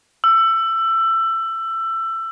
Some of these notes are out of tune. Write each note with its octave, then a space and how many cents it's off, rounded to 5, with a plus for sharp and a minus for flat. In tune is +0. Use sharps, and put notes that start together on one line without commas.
E6 +20